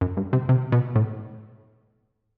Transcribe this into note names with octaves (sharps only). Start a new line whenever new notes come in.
F#2
G2
C3
C3
B2
A2